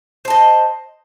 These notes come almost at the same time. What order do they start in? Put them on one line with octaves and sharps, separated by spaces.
C5 A5 D#5